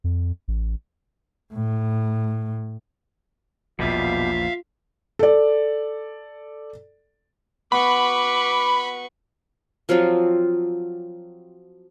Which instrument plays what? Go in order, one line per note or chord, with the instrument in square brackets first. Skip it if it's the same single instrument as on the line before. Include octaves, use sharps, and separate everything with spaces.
[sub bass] F2
A1
[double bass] A2
[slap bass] A#1 E2 [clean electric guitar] B2 G3 [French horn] F4 [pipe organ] E5 F5
[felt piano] A4 D5
[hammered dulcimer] B3 F#4 [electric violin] B4 C#6 [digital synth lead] B5 [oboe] D6
[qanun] F3 F#3 C4 F4